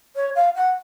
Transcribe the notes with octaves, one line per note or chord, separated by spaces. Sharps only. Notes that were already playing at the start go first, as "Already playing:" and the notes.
C#5
F5
F#5